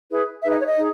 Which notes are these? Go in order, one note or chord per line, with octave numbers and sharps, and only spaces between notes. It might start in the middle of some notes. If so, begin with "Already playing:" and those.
E4 G#4 B4
D#4 G#4 B4 E5
D#5
C#5
D#5
D#4 G#4